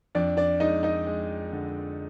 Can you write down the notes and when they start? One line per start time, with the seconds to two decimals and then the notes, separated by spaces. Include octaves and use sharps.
0.15 F2 D4 D5
0.37 D4 D5
0.60 G#3 D#4 D#5
0.83 D#4 D#5
1.07 G#3
1.52 D3